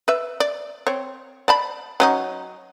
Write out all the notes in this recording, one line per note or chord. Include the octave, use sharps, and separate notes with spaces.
B4 E5
D5
C4 C#5
D5 A5 B5
F#3 C#4 D#4